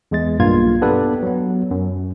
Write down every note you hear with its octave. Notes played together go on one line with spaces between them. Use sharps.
E2 G#3 A6
B1 G2 A#3 F4 F5 G#6
B3 D4 G4 A4 B4
F#3 B3
F#2